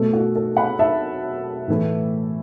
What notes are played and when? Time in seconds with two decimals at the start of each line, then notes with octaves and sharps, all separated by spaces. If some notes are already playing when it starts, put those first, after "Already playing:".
Already playing: B2 A3 A4
0.13 F#4
0.36 A4
0.57 F#5 B5
0.79 E5 A5
1.68 A2 E3 A3